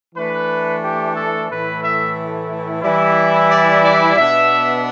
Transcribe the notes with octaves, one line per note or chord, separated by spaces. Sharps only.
E3 A3 D4 B4
G4
A4
A2 E3 A3 E4 B4
E5
E3 G3 E4
D5
D5
B2 B3 D4 E5